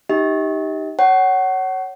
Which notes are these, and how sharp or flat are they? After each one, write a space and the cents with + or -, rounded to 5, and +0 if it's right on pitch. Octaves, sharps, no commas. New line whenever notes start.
D#4 +0 G4 +0 D#5 +45
C#5 +0 F#5 +25